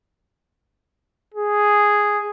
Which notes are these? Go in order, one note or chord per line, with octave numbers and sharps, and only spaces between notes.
G#4